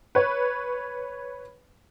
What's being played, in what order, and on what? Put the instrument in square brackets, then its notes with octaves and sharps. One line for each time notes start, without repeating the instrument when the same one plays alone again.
[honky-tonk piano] B4 C#5